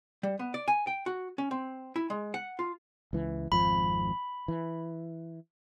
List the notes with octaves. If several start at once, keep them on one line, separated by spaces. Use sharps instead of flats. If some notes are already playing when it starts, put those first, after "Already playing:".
G3
B3
D5
G#5
G5
F#4
C#4
C4
E4
G#3
F#5
F4
C#2 E3
G#1 F2 F3 B5
E3